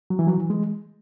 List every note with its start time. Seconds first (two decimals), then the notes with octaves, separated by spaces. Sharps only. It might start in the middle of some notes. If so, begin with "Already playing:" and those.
0.10 F#3
0.19 E3
0.27 F#3
0.38 E3
0.50 G#3